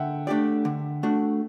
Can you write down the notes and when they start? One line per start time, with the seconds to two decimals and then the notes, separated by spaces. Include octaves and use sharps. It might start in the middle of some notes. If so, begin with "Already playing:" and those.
Already playing: D3 E5 F#5 G5
0.27 A3 D4 G4 D5
0.65 D3
1.03 A3 D4 F#4